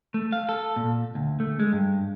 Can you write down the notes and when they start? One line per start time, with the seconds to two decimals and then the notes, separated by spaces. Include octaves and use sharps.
0.14 A3
0.32 F5
0.49 A4
0.76 A#2
1.15 D2
1.40 A3
1.60 G#3
1.73 G2